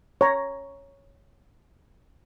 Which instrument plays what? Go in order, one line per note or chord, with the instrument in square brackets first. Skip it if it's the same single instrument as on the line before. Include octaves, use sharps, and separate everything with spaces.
[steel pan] C#5 A#5